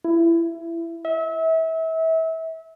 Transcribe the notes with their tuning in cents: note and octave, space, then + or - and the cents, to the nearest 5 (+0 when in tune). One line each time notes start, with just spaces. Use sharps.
E4 +20
E5 -30